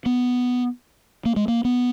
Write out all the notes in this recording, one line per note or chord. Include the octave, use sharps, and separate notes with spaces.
B3
A#3
G#3
A#3
B3